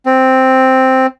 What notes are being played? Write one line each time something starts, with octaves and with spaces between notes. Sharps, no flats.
C4